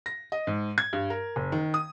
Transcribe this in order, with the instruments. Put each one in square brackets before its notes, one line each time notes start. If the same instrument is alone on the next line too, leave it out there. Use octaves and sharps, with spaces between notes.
[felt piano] A#6
D#5
G#2
G#6
G2
A#4
F#1
D#3
D#6